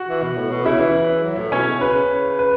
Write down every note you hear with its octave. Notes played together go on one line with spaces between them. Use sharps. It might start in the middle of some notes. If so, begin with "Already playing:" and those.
Already playing: F#4 F#5
E3
B2
A2
B2
C#3 E4 E5
E3
F#3
A2
B2 C#4 C#5
C#3
C#3 B4
C#3
B4